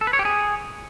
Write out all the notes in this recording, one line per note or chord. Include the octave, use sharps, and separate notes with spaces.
A4
B4
C#5
G4
G#4